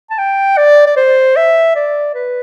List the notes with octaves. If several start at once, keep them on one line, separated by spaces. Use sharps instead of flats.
A5
G5
D5
D5
C5
E5
D5
B4